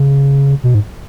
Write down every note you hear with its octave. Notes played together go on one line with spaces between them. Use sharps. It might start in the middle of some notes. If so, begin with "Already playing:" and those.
Already playing: C#3
B2
G#2